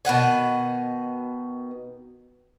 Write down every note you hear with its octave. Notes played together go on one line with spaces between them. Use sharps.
B2 D#3 F#5 G#5